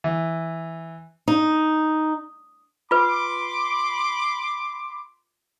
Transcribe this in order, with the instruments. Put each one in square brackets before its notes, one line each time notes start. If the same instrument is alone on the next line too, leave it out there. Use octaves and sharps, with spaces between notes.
[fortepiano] E3
[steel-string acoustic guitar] D#4
[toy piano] F4 B4 [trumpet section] B5 C6 D6